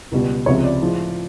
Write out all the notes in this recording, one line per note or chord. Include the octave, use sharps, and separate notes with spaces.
C#2 B2 G3
C#2 C3 F3 G#3 C#5
D5
A2 F3 G#3